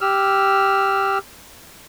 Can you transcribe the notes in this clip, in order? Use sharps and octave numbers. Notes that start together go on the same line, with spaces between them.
G4 E6 F6